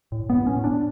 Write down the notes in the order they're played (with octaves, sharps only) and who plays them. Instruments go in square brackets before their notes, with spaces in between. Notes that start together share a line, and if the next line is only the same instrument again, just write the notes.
[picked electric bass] A2
B3
A2
C#4
A2
D4